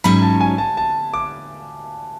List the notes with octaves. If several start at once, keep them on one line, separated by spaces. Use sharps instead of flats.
G#2 F#3 C#4 B5
A5
G#5
A5
A5
D6